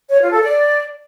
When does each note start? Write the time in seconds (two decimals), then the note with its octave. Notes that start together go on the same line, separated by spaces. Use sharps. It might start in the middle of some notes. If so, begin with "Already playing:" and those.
0.10 C#5
0.21 F4
0.32 A4
0.43 D5